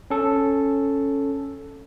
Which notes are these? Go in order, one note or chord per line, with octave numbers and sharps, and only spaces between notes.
C#4 A4